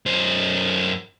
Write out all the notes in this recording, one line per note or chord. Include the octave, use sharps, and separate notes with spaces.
F#2 C5